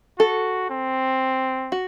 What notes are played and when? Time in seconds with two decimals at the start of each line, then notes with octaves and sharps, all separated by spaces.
0.19 F#4 A4
0.70 C4
1.72 F#4